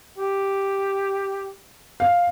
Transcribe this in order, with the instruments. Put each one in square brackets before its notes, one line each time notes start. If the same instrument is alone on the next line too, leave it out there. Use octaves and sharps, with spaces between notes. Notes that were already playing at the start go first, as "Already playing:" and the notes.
[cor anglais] G4
[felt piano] F5